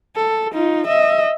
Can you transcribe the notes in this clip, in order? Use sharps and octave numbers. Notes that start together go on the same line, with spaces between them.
A4
D#4 F4
D#5 E5